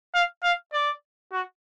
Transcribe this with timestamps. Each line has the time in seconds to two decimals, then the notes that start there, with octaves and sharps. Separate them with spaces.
0.14 F5
0.43 F5
0.73 D5
1.32 F#4